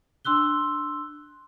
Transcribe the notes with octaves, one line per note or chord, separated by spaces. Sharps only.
D4 C6 E6 F#6 G7